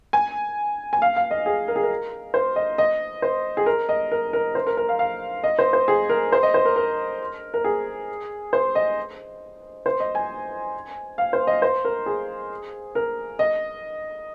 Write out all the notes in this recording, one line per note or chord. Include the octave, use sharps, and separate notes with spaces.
G#5
G#5
F5
F5
D#5
G#4
A#4
G#4
A#4
C5
D#5
D#5
C5
G#4
A#4
D#5
A#4
A#4
C5
A#4
A#4
F5
F5
D#5
C5
C5
G#4
A#4
C5
D#5
C5
A#4
A#4
A#4
G#4
C5
D#5
C5
D#5
G#5
F5
C5
D#5
C5
A#4
G#4
A#4
D#5